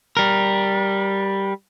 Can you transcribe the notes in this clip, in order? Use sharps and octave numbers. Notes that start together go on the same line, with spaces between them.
G3 A#4